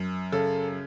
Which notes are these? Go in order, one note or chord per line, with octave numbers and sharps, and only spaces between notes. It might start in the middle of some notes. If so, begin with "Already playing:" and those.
Already playing: F#2
C#3 A4